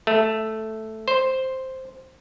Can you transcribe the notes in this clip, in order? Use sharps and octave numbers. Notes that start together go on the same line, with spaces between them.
A3
C5